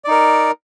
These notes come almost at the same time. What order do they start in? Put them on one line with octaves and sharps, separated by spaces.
D5 D#4 A#4